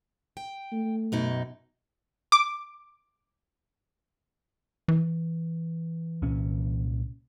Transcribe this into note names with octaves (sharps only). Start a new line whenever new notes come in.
G5
A3
F#2 B2 D#4
D6
E3
C2 A#2 C#4